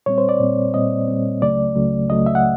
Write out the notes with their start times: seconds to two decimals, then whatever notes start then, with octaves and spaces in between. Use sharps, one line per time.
0.06 A#2 G3 C4 C#5
0.18 C5
0.29 D5
0.40 A#2 G3 C4
0.74 A#2 G3 C4 D#5
1.08 A#2 G3 C4
1.42 C#2 C#3 F#3 A3 D5
1.76 C#2 C#3 F#3 A3
2.10 C#2 C#3 F#3 A3 D#5
2.26 E5
2.35 F#5